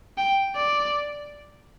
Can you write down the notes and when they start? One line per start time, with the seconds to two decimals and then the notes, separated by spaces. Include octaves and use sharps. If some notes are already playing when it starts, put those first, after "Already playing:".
0.18 G5
0.55 D5